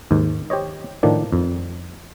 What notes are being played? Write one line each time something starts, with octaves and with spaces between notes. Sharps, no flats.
D#2 G#2
G4 C5 C#5 D#5
A2 D#3 F3 D4
F2